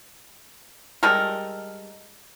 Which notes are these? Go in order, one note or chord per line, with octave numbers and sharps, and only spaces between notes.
G3 G#3 A4 A#4